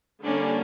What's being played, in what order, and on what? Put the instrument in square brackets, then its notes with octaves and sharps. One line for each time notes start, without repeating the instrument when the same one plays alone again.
[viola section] D3 G3 A#3 C#4 D4